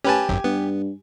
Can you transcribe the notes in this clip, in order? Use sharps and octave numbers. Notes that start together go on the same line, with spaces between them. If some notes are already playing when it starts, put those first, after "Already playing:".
C#4 G4 B4 G#5 A5
G#1 F#2
G2 B3